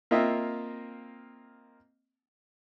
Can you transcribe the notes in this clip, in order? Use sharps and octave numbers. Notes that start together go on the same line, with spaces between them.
A#3 C4 F4 D#5 E5